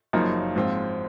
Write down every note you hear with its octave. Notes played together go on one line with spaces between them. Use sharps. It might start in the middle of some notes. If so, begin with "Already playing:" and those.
F#1 F#2 F3 A#3 D#4
G#2 F3 C4 F4